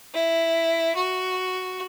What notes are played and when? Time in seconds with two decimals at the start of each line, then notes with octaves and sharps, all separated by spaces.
0.14 E4
0.96 F#4